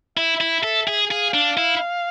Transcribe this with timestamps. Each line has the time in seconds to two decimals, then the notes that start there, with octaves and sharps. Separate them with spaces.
0.17 E4 E5
0.41 E4
0.64 A4
0.88 G#4
1.11 G#4 F5
1.34 D4
1.57 E4